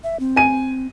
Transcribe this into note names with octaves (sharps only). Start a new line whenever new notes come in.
E5
C4
G#5 D#7